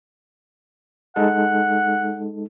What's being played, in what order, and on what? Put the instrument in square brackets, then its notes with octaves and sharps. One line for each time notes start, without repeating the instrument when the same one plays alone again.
[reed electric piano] G#3 D#4 A4 [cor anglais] F#5